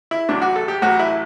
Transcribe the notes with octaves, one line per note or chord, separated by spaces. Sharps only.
E4
A1 A2 F#3 D4
F#4
A4
G4
A1 A2 F#3 F#4
E4